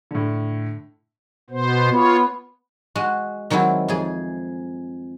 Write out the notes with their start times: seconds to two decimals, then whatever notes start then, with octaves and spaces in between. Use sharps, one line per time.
0.11 A2 D3
1.50 B2 B3 C5
1.90 B3 F4 C#5
2.95 G#3 F#4
3.50 D#3 F#3 G#3 C4 E4
3.88 F2 G#4